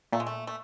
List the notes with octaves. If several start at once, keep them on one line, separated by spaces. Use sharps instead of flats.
A#2 A3
G#3
A3
A3